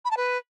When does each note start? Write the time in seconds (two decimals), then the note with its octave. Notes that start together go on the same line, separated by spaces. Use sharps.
0.05 B5
0.11 A5
0.17 B4